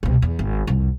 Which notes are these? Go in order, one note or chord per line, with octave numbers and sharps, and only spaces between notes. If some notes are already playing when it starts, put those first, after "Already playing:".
C2 B2
E2
G#1
C2 F2